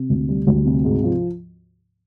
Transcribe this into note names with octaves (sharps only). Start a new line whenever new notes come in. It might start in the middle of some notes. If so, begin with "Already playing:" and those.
Already playing: C3
D2
G3
D2
C3
G#2
F3